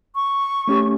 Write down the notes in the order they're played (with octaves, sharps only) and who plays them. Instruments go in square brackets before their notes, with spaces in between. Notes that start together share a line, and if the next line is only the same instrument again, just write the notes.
[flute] C#6
[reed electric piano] A3 C#4 G4